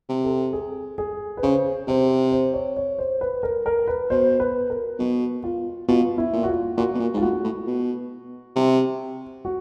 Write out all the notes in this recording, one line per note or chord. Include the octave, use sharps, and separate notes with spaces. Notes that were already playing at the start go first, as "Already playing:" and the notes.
C3
A4
G#4
G#4
B4
C#3 C5
C3 C5
C5
C#5
C#5
C5
B4
A#4
A#4
B4
B2 C5
B4
A#4
B2 F#4
F4
B2 F4
E4
A#2
F#4
F4
A#2 F#4
B2
A#2
G#2 F4
A2 F#4
A2
B2
C3
F#4